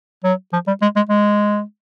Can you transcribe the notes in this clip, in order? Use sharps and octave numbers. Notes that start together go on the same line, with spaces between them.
F#3
F3
G3
G#3
G#3
G#3